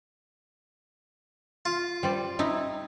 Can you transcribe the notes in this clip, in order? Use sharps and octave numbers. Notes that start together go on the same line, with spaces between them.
F4
G3 C5 D5
D#4 E4